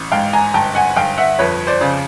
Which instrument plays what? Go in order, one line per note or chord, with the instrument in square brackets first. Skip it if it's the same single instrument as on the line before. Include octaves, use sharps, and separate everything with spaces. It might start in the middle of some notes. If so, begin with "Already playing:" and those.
Already playing: [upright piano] A1
G#2 F5 G5
G#5 A#5
G1 G5 A5
F#5 G#5
G1 F5 G5
E5 F#5
F2 B4 C#5
C5 D5
C#3